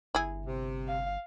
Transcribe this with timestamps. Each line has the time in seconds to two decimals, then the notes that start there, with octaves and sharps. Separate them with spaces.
0.15 G1 E4 G#4
0.46 C3
0.88 F5